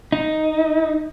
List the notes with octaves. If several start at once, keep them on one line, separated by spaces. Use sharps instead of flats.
D#4